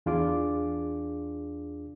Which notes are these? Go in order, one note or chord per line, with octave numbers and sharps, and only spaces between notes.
E2 D4 F4 G#4 D6